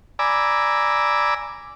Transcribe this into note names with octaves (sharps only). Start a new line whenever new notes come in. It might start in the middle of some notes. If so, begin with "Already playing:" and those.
D5 G#5 A#5 B5 D6 E6